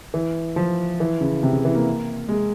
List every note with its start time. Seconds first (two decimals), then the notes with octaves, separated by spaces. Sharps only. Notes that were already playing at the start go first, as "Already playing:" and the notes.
0.14 E3
0.56 F3
1.00 E3
1.21 C#3
1.43 C3
1.53 C#3
1.65 E3
1.75 A#3
2.29 G#3